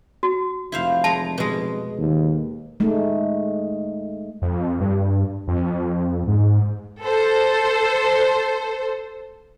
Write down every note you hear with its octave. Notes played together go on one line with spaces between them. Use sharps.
F#4
F1 E4 C5 F5
G#3 A5 A#5
B2 G#3
D#2
G#3 A3 D#4
F2
G2
F2
G#2
A4 C5